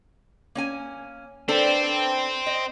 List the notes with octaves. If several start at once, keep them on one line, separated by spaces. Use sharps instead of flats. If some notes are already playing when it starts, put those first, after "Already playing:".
A#3 C#4 G#5
C4 D4 A4 B4
D#5